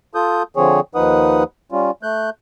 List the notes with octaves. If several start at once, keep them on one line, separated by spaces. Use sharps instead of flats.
F4 A4 D#6 G6
D3 F3 C4 G#4 C#5
D#2 F3 D#4 B4 F#5 D#6
G3 C#4 F4
A3 F#6 G6